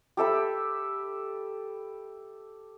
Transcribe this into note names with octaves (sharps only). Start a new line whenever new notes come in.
G4 A4 E5 B5